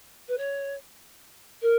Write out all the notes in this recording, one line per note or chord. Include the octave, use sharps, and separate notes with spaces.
B4
C#5
A#4